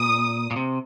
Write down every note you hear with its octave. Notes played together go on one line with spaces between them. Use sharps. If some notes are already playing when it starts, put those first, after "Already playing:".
Already playing: A#2 D#6
A#2
C3